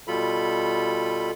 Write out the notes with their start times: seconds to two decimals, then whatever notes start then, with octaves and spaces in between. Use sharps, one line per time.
0.08 B2 G3 F4 A4 B5